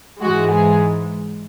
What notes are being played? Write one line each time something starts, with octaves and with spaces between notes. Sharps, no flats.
G#2 E3 G#3 F#4
G#4